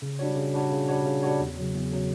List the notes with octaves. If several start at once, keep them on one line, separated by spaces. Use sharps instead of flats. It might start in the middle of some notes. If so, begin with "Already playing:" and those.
C#3
G3 D4 F#4 C#5
C#3
G3 D4 F#4 C#5
C#3
G3 D4 F#4 C#5
C#3
G3 D4 F#4 C#5
E2
C#3 F#3
E2
C#3 F#3